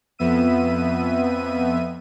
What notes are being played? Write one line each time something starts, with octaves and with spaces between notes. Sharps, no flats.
F2 B3 E5 D#7